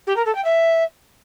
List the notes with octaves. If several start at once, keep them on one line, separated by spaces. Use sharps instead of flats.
G4
A#4
A4
G5
E5